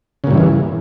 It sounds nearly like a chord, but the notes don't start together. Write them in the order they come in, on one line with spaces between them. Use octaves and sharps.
C#3 A#2 G2 E3 E2